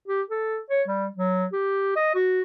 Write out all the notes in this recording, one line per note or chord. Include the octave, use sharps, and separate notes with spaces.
G4
A4
C#5
G3
F#3
G4
D#5
F#4